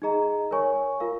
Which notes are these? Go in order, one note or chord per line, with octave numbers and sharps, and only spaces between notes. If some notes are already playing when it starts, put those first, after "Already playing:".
D#4 G#4 D#5 A#5
A#4 C#5 G#5 C#6
F4 A#4 F5